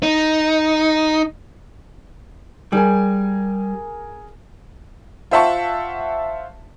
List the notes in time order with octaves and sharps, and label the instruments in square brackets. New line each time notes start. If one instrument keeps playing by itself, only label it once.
[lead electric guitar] D#4
[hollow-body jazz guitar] G3 [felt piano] G#4 A#4 G#5
[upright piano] F4 C5 E5 F#5 A5 C#6